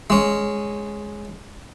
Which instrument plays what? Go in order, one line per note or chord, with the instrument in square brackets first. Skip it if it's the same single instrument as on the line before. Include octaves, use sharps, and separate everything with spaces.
[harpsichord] G#3 C#4